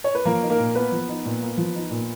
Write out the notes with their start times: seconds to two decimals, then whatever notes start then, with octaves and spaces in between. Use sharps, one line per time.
0.04 C#5
0.15 B4
0.25 F3 A#3 A#4
0.42 D#4
0.50 A#3 A#4
0.59 A#2
0.75 A#3 B3 B4
0.92 F3
1.08 D#4
1.25 A#2
1.42 A#3
1.57 F3
1.75 D#4
1.91 A#2